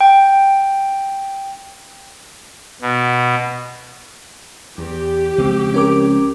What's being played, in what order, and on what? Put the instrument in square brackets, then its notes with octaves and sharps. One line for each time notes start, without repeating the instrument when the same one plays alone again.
[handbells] G5
[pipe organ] B2
[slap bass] E2 [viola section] G4
[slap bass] C#2 F3 C4
[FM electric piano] C#4 A#4 D6